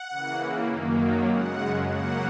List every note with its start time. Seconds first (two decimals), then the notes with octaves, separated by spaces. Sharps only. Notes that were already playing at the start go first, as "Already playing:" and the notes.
Already playing: F#5
0.10 C#3 E3 A#3
0.69 F#2 D#3 F#3 A#3
1.27 F#2 C#3 G#3 F#5
1.85 C#3 F#3 A#3 F#5